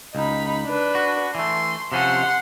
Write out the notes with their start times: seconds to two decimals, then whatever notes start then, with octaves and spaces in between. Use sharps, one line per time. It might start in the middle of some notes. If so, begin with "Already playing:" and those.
0.15 C#2 D#4 B5
0.65 D4 B4
0.95 F#4
1.35 E3 A3 C6
1.92 C3 F3 C#4 F#5 C6